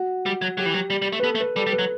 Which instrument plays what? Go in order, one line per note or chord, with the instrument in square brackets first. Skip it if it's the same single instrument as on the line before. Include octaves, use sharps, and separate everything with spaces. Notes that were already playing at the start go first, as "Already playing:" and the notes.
Already playing: [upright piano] F#4
[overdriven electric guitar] G3
F#3
[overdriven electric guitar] F#3 [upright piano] G4
[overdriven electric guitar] E3
F#3
G3
G3
A3
[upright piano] B4
[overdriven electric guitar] B3 [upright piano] A4
[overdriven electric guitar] A3
[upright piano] B4
[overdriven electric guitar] G3 [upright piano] A4
[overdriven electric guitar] G3
[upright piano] B4
[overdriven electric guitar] F#3